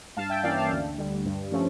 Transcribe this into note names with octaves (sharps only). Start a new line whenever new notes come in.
G2 F5 A5
E5 G5
E3 A#3 C#4 D5 F5
F5 A5
D2
D3 G3
G2
F3 A3 C#4